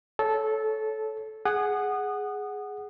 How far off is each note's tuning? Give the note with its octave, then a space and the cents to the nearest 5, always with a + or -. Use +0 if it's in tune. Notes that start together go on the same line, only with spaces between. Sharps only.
A4 -15 C#5 +0
G#4 +0 F#5 +0 D#6 -25